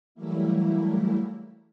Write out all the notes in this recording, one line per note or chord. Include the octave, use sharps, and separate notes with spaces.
E3 F#3 G3 A3 A#3 E4